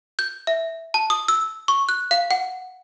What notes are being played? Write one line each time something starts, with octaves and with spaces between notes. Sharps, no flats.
G6
E5
A5
D#6
E6
C#6
F#6
F5
F#5